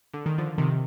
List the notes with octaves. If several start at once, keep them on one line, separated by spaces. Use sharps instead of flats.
D3
D#3
D3 F3
C3 D#3